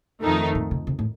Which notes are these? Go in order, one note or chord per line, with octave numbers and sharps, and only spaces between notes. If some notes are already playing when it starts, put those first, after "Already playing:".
F2 D#3 A3 D#4
A#2
C3
C3
A2